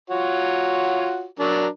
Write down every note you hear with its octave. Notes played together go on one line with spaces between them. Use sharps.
F4 F#4 C#5
F#3 D4 A#4